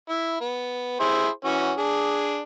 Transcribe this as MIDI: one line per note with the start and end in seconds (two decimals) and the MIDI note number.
0.09 0.39 64
0.41 0.97 59
1.00 1.29 64
1.00 1.29 68
1.00 1.29 72
1.45 1.72 52
1.45 1.72 61
1.45 1.72 66
1.77 2.41 62
1.77 2.41 68